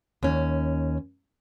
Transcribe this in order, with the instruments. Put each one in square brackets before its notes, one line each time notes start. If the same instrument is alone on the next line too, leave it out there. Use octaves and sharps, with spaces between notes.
[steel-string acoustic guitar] D#2 C#4